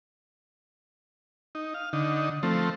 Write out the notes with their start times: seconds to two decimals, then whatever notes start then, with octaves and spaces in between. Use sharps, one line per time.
1.55 D#4
1.74 F5
1.93 D3 D#4
2.43 F3 A3 C4